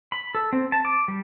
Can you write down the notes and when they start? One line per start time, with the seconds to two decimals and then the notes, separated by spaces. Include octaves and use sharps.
0.12 B5
0.35 A4
0.53 C4
0.72 A5
0.85 D6
1.08 G3